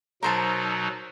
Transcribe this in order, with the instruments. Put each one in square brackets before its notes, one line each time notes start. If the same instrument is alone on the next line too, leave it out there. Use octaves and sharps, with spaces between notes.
[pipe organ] B2 F#3 D#4 [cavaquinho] A#4 C5 A5